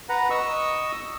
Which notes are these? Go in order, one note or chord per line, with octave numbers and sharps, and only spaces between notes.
B4 F#5 A#5
D#5 C#6 D#6 E6